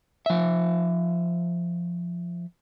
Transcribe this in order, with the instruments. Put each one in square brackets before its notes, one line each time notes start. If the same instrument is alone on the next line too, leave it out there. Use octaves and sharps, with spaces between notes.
[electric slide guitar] F3 E5